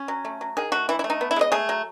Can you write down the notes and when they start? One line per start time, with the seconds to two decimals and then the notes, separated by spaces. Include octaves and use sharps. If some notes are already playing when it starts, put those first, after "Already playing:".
Already playing: C#4
0.08 F#3
0.25 A3
0.41 F#3
0.57 D#3 G#4
0.72 A3 F#4
0.89 E3 E4
0.99 E4
1.04 A3
1.10 D#4
1.21 B3
1.31 E4
1.36 G#3 D#5
1.52 A3 G#4
1.69 F#3